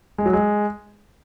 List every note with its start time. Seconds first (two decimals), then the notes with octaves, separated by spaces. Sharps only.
0.18 G#3
0.26 F#3
0.33 G#3